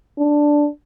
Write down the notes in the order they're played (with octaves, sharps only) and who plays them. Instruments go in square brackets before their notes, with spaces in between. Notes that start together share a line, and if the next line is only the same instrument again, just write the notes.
[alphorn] D4